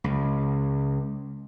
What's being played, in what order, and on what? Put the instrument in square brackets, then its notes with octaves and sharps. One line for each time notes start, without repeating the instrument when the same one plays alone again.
[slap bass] C#2